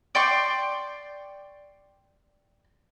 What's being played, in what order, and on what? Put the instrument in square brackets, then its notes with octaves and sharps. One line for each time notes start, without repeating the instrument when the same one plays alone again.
[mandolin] D5 G5 C6 C#6